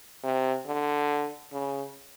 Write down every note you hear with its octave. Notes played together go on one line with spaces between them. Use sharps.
C3
D3
C#3